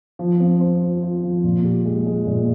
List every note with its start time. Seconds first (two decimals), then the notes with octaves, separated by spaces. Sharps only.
0.19 F3
0.40 C4
0.61 C5
0.81 F4
1.03 F4
1.23 F3
1.44 A#2
1.65 G4
1.85 G#3
2.06 G#3
2.27 A#2